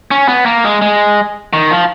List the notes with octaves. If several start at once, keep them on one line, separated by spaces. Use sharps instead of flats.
C#4
B3
A#3
G#3
G#3
D#3
F3